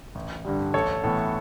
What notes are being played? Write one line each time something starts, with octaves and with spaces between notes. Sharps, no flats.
A1
G2 D3 G3
A1 A4 C#5
A2 E3 B3 A4